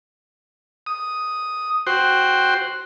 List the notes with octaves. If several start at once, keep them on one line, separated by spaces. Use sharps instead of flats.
D#6
F#4 C5 G5